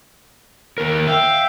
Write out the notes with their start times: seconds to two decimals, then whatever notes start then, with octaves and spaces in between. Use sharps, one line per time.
0.78 D#2 A#4
1.07 E5 F5 G5